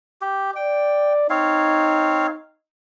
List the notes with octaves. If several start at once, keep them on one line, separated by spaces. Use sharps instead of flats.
G4
D5 G5
C4 D#4 C#5 F5